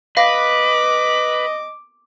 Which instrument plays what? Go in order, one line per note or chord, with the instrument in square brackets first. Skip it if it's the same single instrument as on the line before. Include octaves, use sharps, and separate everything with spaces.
[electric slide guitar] B4 [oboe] D#5 [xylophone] F5 A#6 [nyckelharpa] D6